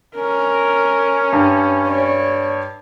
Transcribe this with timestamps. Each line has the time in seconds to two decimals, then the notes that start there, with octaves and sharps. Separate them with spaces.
0.16 C#4 A#4
1.33 G2
1.87 C#5 D5